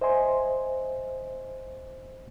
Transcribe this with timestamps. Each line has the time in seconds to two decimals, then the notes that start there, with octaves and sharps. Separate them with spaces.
0.01 C5 D#5 E5 G#5 C6